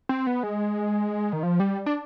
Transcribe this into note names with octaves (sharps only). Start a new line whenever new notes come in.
C4
B3
G#3
D#3
F3
G3
D4